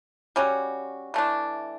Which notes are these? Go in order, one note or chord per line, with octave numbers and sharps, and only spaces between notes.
G3 C#4 F#4
E3 A3 D4